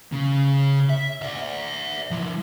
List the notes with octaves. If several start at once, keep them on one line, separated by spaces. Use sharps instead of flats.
C#3
E5
D5 E5
F3 E4